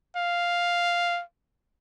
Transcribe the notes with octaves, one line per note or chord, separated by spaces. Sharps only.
F5